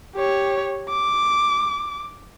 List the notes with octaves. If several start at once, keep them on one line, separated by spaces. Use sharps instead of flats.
G4 C#5
D6